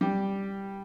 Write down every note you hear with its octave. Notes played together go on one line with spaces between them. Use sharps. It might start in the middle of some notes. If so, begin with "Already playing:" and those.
G3 G4